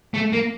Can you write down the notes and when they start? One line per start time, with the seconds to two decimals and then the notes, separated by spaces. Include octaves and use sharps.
0.14 A3
0.33 A#3